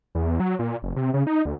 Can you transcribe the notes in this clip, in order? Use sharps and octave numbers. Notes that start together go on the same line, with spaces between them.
E2
F#3
A#2
F#1
C3
C#3
D#4
D2